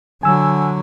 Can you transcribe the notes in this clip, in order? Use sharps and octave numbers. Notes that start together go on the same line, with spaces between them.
D3 F#3 G#5 E6